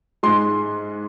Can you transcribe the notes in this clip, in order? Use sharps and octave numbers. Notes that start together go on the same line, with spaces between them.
G#2 G#3 C6